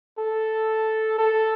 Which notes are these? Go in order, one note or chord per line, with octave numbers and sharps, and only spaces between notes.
A4
A4